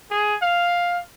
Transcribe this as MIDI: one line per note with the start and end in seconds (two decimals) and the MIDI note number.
0.11 0.35 68
0.42 1.02 77